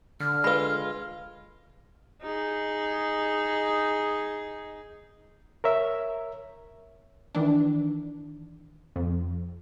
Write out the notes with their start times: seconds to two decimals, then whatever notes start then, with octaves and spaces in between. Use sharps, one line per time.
0.20 D3 F6
0.44 G#3 F4 B4 B5
2.22 D#4 G#4
5.64 A#4 C#5 E5
7.35 D#3 E3 D4
8.96 F2